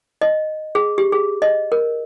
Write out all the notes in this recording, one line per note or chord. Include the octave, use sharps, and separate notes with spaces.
D#5
G#4
G4
G#4
D#5
A#4